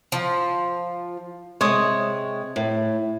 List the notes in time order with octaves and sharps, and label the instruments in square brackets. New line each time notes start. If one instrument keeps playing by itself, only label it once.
[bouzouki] F3
[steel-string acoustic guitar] C3 G#3 [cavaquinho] C5 C#5 D#6
[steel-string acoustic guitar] A2